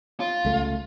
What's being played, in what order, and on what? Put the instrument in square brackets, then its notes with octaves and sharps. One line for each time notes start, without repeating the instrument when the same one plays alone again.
[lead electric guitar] F4
[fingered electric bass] C#2 A3